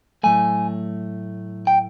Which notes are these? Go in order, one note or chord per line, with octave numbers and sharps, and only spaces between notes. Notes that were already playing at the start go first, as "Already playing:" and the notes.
A2 F#3 A3 G#5
G5